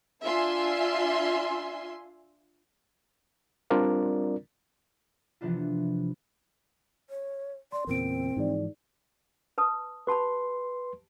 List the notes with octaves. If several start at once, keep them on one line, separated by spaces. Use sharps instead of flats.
D4 F4 E5 G#5 C6
G3 C4 D4 F4 A#4 D5
C3 E3 F3 B3 D4 F4
C#5
D5 C6
E2 A#2 C#3 C4 A#4 D7
G#2 E3 F3 D#4 G#4 D5
B4 A5 D#6
G4 B4 A5 B5 C6